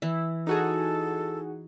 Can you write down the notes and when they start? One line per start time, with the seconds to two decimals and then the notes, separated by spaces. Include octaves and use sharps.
0.02 E3 E4
0.47 D#4 F#4 G#4 A4